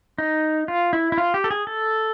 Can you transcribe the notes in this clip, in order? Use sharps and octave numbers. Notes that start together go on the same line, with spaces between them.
D#4
F4
E4
E4
F4
G4
A4
G#4
A4